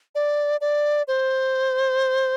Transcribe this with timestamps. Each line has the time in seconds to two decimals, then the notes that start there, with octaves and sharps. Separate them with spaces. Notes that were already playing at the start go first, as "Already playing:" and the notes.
0.15 D5
0.61 D5
1.08 C5